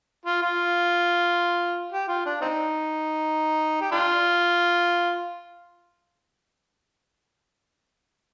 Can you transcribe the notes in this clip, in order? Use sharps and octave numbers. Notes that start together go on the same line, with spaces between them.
F4
F4
G4
F4
D4
C4 D#4
G4
D4 F4